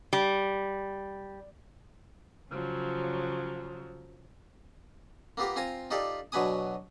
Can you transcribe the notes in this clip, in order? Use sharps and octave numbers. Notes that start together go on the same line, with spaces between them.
G3
C#3 F3 F#3
A#3 B3 F4 G4 A#4
C4 F4 G#5 A#5
D#4 F4 G4 A4 D5
B2 F#3 D4 B4 G#5 D#6